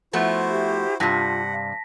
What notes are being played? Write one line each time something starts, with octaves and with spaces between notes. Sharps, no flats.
F3 A3 B3 E4 F#4 C5
G4
G2 C3 F4 F#5 A5 A#6 B6
F5